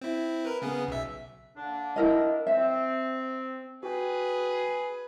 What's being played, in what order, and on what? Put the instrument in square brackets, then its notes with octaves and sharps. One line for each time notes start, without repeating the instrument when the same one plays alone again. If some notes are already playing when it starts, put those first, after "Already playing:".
[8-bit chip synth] C4 E4
A#4 B4
C#3 B3 G#4
B1 E5
[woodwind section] D3 A#3 D4
[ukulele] E4 A#4 D#5
[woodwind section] C4 [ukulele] E5
[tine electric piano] F#4 G5 [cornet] G#4 [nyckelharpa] B4